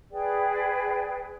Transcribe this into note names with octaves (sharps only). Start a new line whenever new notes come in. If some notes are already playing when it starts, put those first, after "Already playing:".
G#4 B4 D5 G5